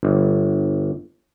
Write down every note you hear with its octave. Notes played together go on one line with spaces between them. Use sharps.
G1